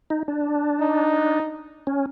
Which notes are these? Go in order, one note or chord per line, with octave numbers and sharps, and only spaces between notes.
D#4
D4
D#4
C#4